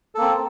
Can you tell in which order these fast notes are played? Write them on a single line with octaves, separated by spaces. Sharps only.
A4 A#3 C4